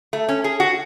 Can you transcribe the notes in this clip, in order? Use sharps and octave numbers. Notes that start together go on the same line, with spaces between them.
A3
C#4
G#4
F#4